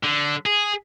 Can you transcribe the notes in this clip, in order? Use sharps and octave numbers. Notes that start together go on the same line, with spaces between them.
D3
G#4